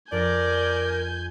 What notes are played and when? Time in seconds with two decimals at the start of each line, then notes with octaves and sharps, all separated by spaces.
0.12 F2 A#4 D5 G#5 D6 G6 A#6